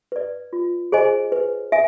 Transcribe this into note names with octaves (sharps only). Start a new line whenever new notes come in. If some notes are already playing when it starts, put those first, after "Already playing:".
B4 D5
F4
G#4 C5 D#5 G#5
B4
E5 G#5